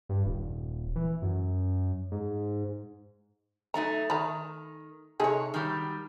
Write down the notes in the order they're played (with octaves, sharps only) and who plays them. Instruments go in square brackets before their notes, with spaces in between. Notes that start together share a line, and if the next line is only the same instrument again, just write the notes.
[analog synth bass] G2
D#1
E3
F#2
G#2
[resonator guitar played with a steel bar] F#3 A3 D#4 [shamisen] A#5
[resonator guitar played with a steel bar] D#3 [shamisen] A#5 B5
[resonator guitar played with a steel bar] C3 C#5 [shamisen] D#4 G#4 A4
[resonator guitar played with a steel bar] D#3 F#3 G3